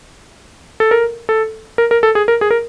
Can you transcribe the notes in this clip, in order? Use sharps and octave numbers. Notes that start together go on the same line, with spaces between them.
A4
A#4
A4
A#4
A#4
A4
G#4
A#4
G#4
A#4